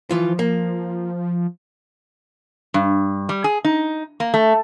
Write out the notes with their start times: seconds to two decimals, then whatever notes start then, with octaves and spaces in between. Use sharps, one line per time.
0.11 E3 F3 F4
0.39 A#3
2.74 G2
3.29 G3
3.44 G#4
3.64 D#4
4.20 A#3
4.34 A3